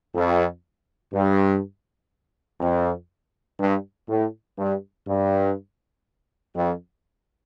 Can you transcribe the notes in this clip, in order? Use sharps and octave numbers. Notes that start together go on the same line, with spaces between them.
F2
G2
F2
G2
A2
G2
G2
F2